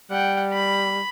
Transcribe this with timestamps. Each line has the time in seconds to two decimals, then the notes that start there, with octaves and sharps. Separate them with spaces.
0.10 G3 F#5 G5
0.54 B5